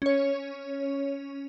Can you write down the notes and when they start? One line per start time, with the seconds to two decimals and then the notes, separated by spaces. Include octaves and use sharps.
0.02 C#4 C#5